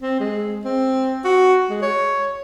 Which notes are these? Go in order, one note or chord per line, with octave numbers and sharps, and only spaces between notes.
C4
G#3
C4
F#4
G#3
C#5